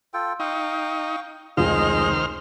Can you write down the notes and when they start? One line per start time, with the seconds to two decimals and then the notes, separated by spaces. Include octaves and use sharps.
0.14 F4 A4 G5
0.40 D#4 F5 G5 C#6
1.57 F1 C#2 D#3 G#4 C5 D#5 F6